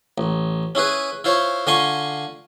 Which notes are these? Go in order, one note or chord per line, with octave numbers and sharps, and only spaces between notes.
A1
C#4 E4 G#4 B4
E4 F4 C5 C#5
D3 F4 G#5 C6 C#6